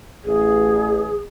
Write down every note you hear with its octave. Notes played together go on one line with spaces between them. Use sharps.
A1 G#4